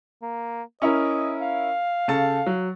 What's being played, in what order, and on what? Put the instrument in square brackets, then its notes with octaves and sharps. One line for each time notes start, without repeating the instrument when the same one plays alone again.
[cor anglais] A#3
[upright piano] C#4 E4 A#4 [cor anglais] D#5
[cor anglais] F5
[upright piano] C#3 A4 A5
F#3